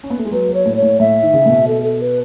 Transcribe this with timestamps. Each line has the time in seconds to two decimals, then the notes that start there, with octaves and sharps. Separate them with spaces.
0.04 C#4
0.10 B3
0.18 A3
0.25 G#3
0.31 F#3 B4
0.49 F#3
0.54 C#5
0.66 A2
0.77 C#5
0.82 A2
1.00 A2 E5
1.23 D#3
1.34 C#3
1.46 A2
1.50 B2
1.67 A4
1.83 A4
2.01 B4